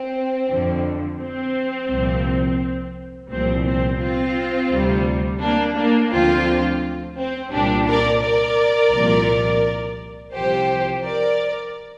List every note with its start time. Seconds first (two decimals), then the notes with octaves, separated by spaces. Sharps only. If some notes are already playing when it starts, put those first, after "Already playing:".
Already playing: C4
0.48 F2 D3 F3
1.19 C4
1.89 C2 A#2 F3
3.30 C2 A#2 F3 C4
3.65 C4
4.00 C4 F4
4.71 D2 C3 G3
5.41 A#3 D4
5.76 A#3 D4
6.11 D2 D3 F3 C4 F4
7.17 C4
7.52 C2 A#2 G3 D4 G4
7.87 A#4 D5
8.23 A#4 D5
8.93 C2 A#2 F3
10.34 C2 C3 F3 G4 C5
11.04 A#4 D5